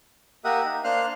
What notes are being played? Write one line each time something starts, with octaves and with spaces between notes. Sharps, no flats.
A#3 G4 A#4 E5 F#5 D#6
D#4
A#3 D4 C5 F5 F6 F#6